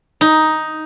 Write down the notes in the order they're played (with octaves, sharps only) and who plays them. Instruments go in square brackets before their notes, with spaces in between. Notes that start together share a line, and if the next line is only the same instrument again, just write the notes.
[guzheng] D#4